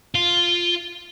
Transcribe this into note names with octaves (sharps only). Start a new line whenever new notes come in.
F4